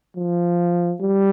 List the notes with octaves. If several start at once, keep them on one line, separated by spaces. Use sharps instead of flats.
F3
G3